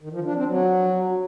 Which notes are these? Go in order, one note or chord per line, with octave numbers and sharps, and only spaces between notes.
D#3
F3
D4
C4
F#3